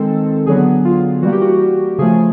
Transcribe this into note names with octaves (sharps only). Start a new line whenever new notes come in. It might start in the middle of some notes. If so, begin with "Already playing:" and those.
Already playing: D#3 G#3 C4 A4
D3 F#3 B3 G#4
F4
E3 G3 A#3 F#4
G4
F#4
C#3 F3 A3 G#4